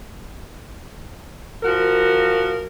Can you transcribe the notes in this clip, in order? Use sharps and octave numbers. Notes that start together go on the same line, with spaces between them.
F3 F#4 A#4